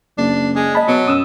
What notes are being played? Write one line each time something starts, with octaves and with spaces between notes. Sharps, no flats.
F#1 D4
G#3
D#5 A5 B5
B2 F#3
F#2 D#6 E6